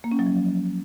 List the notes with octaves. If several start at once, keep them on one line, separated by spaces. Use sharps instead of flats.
A#3
C#4
F#3
F3